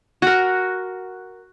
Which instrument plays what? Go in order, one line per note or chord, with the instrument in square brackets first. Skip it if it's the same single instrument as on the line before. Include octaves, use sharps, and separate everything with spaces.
[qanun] F#4 A#4